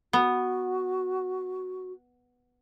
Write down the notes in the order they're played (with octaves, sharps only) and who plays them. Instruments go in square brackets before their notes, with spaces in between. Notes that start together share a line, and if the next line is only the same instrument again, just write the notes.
[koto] B3 [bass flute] F#4